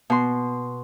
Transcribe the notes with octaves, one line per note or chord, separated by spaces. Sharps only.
B2 C6